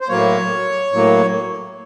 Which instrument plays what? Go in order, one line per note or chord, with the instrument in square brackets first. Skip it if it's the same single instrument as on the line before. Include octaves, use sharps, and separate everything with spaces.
[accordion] C5
A2 F#3 A#3 C#5
A2 F#3 A#3